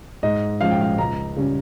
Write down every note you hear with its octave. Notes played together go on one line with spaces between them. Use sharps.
G#2 D#5
F3 G#3 C#4 F5
G5
F5
C#2 A#5
C#3 G3 C#4